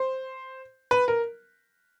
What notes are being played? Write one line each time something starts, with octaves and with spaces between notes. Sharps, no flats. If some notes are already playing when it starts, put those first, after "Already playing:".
Already playing: C5
B4
A#4